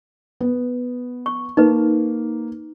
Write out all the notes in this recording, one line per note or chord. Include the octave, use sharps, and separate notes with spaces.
B3
C#6
A#3 D#4 B4